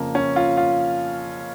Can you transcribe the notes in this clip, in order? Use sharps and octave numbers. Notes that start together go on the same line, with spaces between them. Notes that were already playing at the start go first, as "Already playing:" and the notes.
Already playing: F2 C#3 F3 A#3
C#4
F4
F4